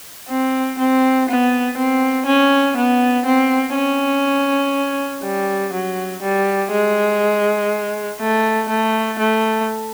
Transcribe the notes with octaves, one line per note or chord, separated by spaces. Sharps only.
C4
C4
B3
C4
C#4
B3
C4
C#4
G3
F#3
G3
G#3
A3
A3
A3